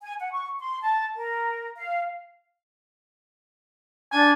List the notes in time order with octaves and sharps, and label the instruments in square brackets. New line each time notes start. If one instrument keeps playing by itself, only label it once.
[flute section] G#5
F#5
C#6
C6
A5
A#4
F5
[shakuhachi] D4 [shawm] G#5